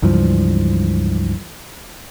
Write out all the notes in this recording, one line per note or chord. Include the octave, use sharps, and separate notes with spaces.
C#2 G2 E3 F3